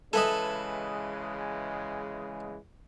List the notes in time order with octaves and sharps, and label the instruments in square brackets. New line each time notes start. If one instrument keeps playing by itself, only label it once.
[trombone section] C#3 E3 G#3 [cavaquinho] A4 B4 [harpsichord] D#5 E5 G#5